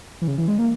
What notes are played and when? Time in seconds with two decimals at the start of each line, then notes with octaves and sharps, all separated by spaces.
0.21 E3
0.28 C#3
0.38 E3
0.48 G#3
0.59 A#3